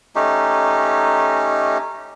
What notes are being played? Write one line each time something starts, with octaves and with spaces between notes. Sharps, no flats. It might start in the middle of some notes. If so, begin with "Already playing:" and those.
A3 C#4 D#4 G4